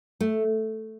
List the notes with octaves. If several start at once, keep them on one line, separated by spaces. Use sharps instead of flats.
A3